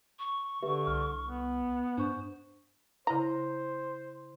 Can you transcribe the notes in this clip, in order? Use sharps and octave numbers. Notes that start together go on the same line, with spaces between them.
C#6
D3 G4 B4 E5
C2 F6
B3
G2 D4 C5 C#6
C#3 E4 C5 A#5 A#6